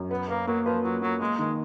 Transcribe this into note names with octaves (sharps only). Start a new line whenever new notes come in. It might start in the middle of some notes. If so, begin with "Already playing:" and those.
Already playing: F#2
B3 B4
A#3 B4
F#3 A#3
F3 B4
F#3 F4
F#3 A#3
G#3 A#3
D#3 G#3